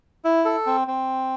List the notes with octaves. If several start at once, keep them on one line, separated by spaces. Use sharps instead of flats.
E4
A4
C4
C4